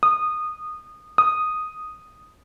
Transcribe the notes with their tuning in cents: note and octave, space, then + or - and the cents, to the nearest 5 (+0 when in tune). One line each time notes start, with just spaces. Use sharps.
D#6 -20
D#6 -5